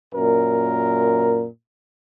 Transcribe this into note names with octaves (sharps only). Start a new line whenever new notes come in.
F#2 A#2 A#4